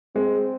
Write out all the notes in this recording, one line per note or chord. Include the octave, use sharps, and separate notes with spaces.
G#3 C4